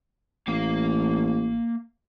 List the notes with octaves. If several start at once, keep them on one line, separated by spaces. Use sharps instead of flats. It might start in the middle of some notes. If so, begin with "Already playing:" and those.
A1 A#3 F5